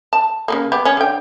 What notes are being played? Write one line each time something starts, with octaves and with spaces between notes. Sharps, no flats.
A5
C#3 A3 A#3
B3 G4
C#4
D3 G5